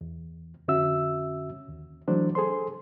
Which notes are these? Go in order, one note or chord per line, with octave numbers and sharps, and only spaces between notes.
E2
F2 D3 C#4 F#4 E5 E6
D#2
E3 F#3 A3 D4 C5
G#4 A4 C5 C6